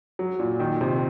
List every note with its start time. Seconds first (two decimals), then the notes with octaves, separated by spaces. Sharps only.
0.19 F#3
0.40 A#2
0.60 D#3
0.81 C3